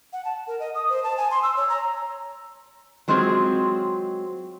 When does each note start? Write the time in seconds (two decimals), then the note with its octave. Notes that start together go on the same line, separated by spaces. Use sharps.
0.13 F#5
0.25 A5
0.47 A#4
0.59 D#5
0.75 D#6
0.89 C5
1.04 A5
1.17 G#5
1.31 C6
1.43 E6
1.57 C#5
1.69 A#5
3.08 F#3 G#3 C4 F4 G#4